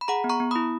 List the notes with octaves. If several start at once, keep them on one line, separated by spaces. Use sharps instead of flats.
B5
G#4 F#5 A#5
B3
A#5 C#6
B3
E4 B5 D#6